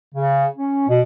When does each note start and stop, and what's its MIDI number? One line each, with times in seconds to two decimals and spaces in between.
0.15 0.47 49
0.56 0.86 61
0.87 1.00 47